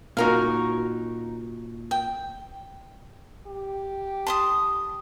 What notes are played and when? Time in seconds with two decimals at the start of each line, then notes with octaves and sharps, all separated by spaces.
0.17 A#2 C#4 D#4 F#4 A#4 F5
1.91 G5
3.46 G4
4.27 A5 C6 D#6